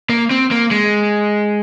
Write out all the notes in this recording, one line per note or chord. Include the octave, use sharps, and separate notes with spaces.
A#3
C4
A#3
G#3